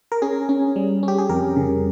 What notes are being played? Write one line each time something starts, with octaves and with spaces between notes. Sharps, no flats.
A#4
C#4 G#4
C#4
G3
C#4
G4
G#4
F2 A#4
C#3